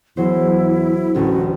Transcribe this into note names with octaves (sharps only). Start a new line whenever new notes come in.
E2 F#3 G#3 E4 C5
A1 D2 C#4 F#4